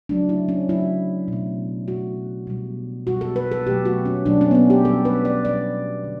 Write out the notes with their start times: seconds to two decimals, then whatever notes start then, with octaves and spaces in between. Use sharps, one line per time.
0.09 C#3 F#3 A3 D4
0.29 E4
0.49 C#4
0.69 C#3 F#3 A3 E4
1.28 B2 A3
1.88 B2 A3 F#4
2.47 B2 G3
3.07 B2 G3 F#4
3.21 A4
3.36 B4
3.52 A4
3.66 B2 F#3 A3 G4
3.85 F#4
4.05 C#4
4.26 B2 F#3 A3 D4
4.41 C#4
4.51 B3
4.55 C#4
4.70 G4
4.85 B2 G3 A4
5.05 B4
5.25 D5
5.45 B2 G3 D5
6.04 D3